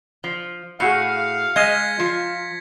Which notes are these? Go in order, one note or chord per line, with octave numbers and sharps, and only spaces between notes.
F3
A2 F#4 G#4 F5 C#7
G#3 D#5 G#6 A#6 B6
F3 F4